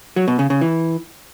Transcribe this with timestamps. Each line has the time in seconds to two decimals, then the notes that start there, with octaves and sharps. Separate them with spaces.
0.16 F#3
0.28 B2
0.39 C#3
0.50 C#3
0.61 E3